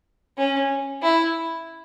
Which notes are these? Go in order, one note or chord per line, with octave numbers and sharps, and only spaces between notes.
C#4
E4